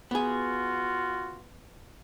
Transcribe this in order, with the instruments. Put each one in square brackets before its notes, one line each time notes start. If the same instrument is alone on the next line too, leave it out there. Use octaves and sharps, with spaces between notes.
[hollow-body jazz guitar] B3 G#4 [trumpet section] F4 F#4